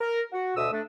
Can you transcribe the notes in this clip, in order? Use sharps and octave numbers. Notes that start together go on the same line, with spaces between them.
A#4
F#4
D2 B2 E5 D#6 E6
A3 D4